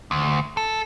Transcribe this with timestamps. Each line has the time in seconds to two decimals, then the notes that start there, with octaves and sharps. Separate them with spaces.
0.11 D2
0.57 A4